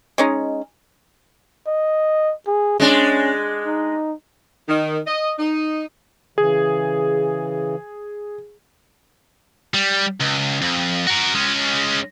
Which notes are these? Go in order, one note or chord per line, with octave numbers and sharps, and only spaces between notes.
G#3 C#4 D#4
D#5
G#4
G#3 C#4 D4
D#4
D#3
D#5
D#4
C#3 E3 G#4
G3
C#2
F2
F#4 A#4
G#3 C#4